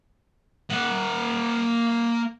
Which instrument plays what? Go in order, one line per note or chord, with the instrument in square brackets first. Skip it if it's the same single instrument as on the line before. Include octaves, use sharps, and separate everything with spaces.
[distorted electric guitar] A#3 F#5